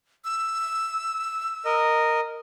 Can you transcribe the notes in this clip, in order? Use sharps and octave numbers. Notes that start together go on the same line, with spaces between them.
E6
A#4 D#5